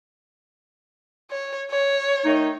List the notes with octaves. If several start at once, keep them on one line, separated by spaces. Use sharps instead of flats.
C#5
C#5
D#3 A3 D#4